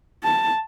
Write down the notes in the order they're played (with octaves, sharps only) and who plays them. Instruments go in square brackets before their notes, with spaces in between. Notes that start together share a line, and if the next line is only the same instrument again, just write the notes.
[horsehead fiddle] A5